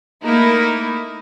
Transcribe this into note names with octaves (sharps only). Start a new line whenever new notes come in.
A3 A#3 D#4 E4 A#4